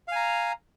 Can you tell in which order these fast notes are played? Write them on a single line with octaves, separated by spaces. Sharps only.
F5 G#5 A#5